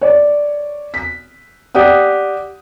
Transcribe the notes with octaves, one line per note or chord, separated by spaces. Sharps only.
C#5 D5
B6
G4 D5 F#5 D#6